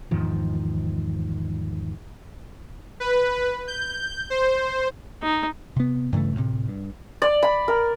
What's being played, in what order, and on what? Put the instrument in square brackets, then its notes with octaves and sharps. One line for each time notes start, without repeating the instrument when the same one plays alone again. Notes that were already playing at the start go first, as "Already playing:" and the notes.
[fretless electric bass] E2 G#2 D#3 F3
[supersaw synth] B4
G6
C5
[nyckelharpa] D#4
[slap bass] C3 B3
G2 C#3 E3 A3
D2 A2 C3
G2
[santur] D5
B5
A#4